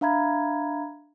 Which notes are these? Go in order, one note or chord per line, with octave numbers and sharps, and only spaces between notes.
D4 E5 F5 A#5 B5 G#6